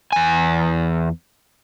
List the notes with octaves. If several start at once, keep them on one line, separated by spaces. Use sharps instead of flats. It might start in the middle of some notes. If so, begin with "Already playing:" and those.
E2 G#5